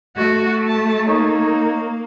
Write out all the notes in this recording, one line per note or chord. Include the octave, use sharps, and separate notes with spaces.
A3 F#4
A5
A#3 D#4 C#5